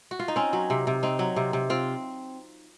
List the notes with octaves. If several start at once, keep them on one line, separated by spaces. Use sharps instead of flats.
F#4
F4
D#4
C4 C#4
F#3
C3
C3
C4 D#4
F#3
C3
C3
C4 F4